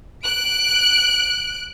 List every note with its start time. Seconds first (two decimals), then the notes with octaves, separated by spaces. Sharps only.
0.24 F#6 D7